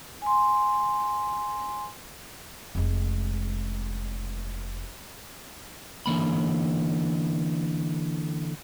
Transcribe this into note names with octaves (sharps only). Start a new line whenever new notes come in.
G#5 C6
F1 G#3
D3 E3 A#3 B5